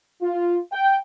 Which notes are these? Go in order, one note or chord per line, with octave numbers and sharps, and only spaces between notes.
F4
G5